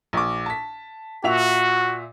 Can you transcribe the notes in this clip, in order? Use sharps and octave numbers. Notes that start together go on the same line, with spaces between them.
A#1 D6
A5 B6
A#2 F#4 E5 F7